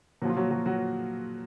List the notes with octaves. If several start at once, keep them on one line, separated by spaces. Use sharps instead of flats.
A#2 F3 F#3 F4 F#4
F#3 F#4
F#3 F#4
F#3 F#4